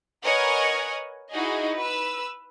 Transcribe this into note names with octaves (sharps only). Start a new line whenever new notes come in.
A#4 B4 C#5 D#5 F#5 G#5
D#4 E4 F#4 G#4 D#5
B4 E6